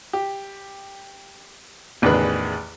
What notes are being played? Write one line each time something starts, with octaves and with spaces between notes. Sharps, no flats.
G4
A1 E2 D#3 D4 G#4 B4